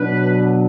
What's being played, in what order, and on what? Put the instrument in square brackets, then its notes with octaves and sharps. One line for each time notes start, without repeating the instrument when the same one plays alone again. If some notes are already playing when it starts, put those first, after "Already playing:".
Already playing: [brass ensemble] B2 F#3 D4 B4